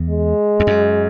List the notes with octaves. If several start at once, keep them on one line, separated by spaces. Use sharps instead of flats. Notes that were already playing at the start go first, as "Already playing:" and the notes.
Already playing: E2
G#3
E2
F#2